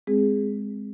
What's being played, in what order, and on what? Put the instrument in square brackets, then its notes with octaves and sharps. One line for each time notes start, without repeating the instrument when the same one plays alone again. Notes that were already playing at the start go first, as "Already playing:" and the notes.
[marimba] G#3 C4 G#4